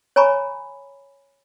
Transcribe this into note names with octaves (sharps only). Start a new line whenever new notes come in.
C#5 G#5 A#5 B5 C#6